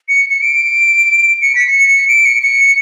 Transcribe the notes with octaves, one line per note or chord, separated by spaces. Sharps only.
C#7
C#7
D7
C#7
B6
C#7
D7
C#7
C#7